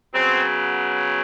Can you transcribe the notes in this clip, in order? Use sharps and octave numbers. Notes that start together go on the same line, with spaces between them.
C#3 F#3 B3 C4